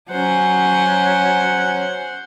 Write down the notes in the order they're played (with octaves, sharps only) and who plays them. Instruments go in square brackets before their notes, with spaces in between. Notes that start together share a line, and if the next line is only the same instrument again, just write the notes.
[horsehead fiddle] F#3 C#4 [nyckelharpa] C5 F#5